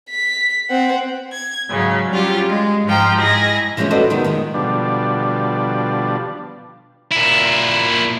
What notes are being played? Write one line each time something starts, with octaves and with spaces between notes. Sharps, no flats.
B6
C4 F#5
G#6
G#2 C#3 F#3
F#3 G3 C#4 F4 G4
G#3
G#2 F3 G5 A#5
G#2 E4 G#4 D#5 A#6
E3 F3 G#3 C4 C#4
F#4 A4 B4 C5 D5 D#5
C3 D#3 G#3 B3
F2 D#3 G#3
B2 D3 F3 G3 D4
A#2 E4